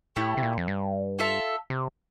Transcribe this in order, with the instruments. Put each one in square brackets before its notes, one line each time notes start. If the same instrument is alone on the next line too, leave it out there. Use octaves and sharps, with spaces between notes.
[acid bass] A2 [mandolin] A3 E4 G4
[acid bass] C3
A#2
F2
G2
[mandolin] F4 A4 E5
[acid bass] C3